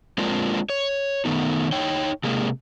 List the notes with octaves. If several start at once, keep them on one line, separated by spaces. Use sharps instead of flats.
G#3 A#3 C4 D4 F4
C#5
D#3 A3 B3 D#4
D#4 C#5 G5
C3 G#3 A#3